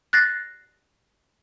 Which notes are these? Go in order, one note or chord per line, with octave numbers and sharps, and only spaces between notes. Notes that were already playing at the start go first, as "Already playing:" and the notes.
F#6 A6 A#6 C7